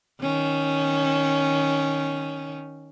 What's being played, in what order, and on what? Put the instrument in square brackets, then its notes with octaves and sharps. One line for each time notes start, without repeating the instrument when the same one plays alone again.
[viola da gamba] D#3 C#4